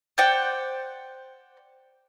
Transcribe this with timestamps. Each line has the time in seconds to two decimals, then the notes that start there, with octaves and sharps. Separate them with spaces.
0.18 C5 D5 F#5 G5